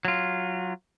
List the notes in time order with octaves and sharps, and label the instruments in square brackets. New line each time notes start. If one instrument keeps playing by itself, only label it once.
[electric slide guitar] F#3 F4